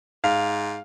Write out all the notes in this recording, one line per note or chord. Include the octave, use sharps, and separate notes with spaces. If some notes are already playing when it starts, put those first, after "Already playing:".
G#2 F5